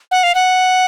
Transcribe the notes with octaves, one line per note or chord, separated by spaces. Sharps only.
F#5
F5
F#5